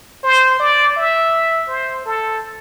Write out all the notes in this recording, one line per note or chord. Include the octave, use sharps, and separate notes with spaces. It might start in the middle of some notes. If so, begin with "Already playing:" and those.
C5
D5
E5
C5
A4